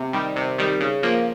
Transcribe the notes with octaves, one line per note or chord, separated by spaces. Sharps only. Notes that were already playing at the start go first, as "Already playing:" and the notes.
Already playing: C3
D#3 G3
C3
D#3 G3
C#3
F3 A#3